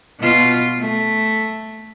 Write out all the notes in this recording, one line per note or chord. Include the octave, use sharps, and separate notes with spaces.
B2 F4
A3